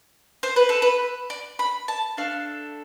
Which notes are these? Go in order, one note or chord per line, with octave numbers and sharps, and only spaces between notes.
C5
B4
A4
B4
D5
B5
A5
A3 D4 A4 F5